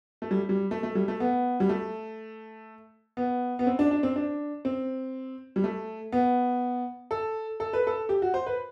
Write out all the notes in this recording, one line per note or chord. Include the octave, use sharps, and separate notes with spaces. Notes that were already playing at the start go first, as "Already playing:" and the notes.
A3
G3
G3
A3
A3
G3
A3
B3
G3
A3
B3
B3
C4
D4
D4
C4
D4
C4
G3
A3
B3
A4
A4
B4
A4
G4
F#4
C5
B4